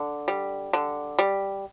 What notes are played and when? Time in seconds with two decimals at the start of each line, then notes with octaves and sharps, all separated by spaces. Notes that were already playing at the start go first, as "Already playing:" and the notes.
Already playing: D3
0.28 G3
0.73 D3
1.19 G3